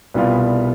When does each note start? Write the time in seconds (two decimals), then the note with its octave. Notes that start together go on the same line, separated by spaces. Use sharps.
0.14 C2 B2 G3 B3 F4